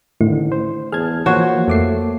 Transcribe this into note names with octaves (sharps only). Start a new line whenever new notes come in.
A1 A2 D3 D#3 A3 E4
C5
E2 G#4 A5 F6 G#6
E3 F3 A#3 F#4 C5 C#5
F2 A3 A4 D6 C7